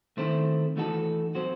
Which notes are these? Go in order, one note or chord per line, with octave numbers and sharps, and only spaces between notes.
D#3 A3 C4 E4 C5
E3 A3 D#4 F#4 A4
F#3 C4 F#4 C5